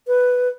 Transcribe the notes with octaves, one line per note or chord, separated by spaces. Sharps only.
B4